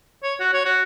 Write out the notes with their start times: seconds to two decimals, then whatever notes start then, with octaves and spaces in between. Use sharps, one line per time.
0.23 C#5
0.40 F#4
0.53 C#5
0.65 F#4